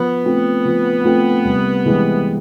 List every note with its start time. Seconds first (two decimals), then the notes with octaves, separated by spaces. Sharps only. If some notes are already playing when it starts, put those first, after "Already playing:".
Already playing: F3 B3
0.25 A3 C4 F4
0.65 F3
1.05 A3 C4 F4
1.45 C2
1.85 C3 E3 G#3 C4